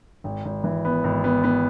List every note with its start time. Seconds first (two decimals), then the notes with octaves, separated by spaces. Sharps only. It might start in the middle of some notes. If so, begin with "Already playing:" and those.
0.24 G#1
0.45 G#1
0.64 E3
0.85 B3
1.04 G#1
1.24 B3
1.44 B3